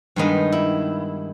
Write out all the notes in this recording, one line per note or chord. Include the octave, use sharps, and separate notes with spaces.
G2 D#3 G#3 B3 D#4
E4